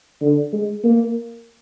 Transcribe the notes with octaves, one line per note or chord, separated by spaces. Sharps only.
D3
G#3
A#3